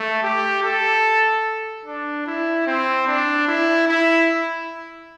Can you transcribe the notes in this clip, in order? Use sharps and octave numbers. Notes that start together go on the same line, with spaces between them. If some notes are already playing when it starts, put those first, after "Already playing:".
Already playing: A3
G4
A4
D4
E4
C4
D4
E4
E4